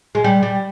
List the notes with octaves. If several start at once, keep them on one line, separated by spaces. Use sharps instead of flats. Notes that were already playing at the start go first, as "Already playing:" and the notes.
G#3
G3
G3